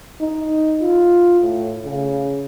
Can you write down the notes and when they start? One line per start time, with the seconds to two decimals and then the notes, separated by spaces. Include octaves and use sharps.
0.20 D#4
0.81 F4
1.41 A2
1.85 C#3